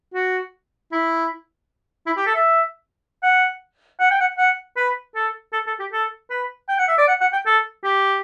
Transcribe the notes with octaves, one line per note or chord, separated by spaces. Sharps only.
F#4
E4
E4
G4
A4
E5
F#5
F#5
G5
F#5
F#5
B4
A4
A4
A4
G4
A4
B4
G5
F#5
E5
D5
F#5
F#5
G5
A4
G4